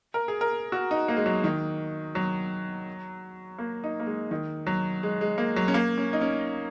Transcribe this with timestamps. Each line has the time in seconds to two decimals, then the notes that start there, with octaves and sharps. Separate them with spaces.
0.14 A#4
0.28 G#4
0.41 A#4
0.72 F#4
0.91 D#4
1.08 A#3
1.17 G#3
1.26 F#3
1.44 D#3
2.15 F#3
3.58 A#3
3.84 D#4
4.00 A#3
4.06 G#3
4.31 D#3
4.67 F#3
5.03 G#3
5.21 G#3
5.38 A#3
5.56 F#3
5.68 C#4
5.74 A#3
5.98 C#4
6.13 D#4
6.21 C#4